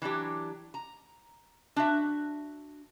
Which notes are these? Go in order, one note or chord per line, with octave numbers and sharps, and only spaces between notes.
E3 F#3 D4 G4
A#5
D4 F#4 E5